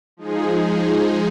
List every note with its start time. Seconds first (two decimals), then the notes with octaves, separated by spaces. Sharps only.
0.17 F3 G#3 D#4 G#4